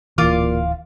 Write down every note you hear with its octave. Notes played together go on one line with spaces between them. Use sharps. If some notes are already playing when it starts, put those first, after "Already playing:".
D1 A#2 E3 F4 F5 D6